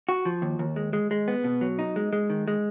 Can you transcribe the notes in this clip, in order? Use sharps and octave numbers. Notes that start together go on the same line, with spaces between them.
F#4
F3
D#2
D#2
G#3
G#3
G#3
B3
B2
F#3
D#4
G#3
G#3
D#3
G#3